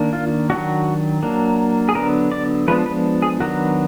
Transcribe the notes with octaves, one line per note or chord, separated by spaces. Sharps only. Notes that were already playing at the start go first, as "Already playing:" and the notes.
Already playing: D#3 A#3 D4
F4
D#3 F#3 D4 F#4
F#3 A#3 D4
G#4
D3 F#3 B3 D4 A#4
D5
F3 G#3 B3 D4 B4
B4
G#4
D#3 F#3 B3 D4 F#4